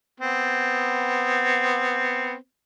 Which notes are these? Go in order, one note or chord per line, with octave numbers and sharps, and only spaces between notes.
B3 C4